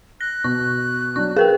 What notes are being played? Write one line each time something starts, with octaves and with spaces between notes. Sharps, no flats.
F#6 A#6
B2 C#6
F#3 D4 C#6
G#4 A#4 B4 G5